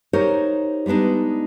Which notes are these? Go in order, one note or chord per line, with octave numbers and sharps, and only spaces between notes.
D#4 F#4 G4 A#4 C5 C#5
G3 G#3 B3 D4 D#4